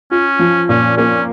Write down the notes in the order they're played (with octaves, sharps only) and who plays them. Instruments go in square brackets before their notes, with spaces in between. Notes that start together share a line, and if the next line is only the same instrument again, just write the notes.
[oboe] C#4 [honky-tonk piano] F4
[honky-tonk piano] F3
[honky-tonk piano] A#2 [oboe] C#4
[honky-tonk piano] A#3 [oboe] C#4